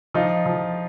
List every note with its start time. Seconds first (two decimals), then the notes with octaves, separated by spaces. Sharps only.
0.14 F3 D#4 F4
0.46 F3